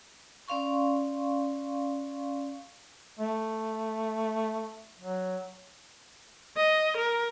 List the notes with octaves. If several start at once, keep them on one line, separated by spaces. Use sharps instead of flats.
C#4 D5 F5 C6 C#6
A3
F#3
D#5
A#4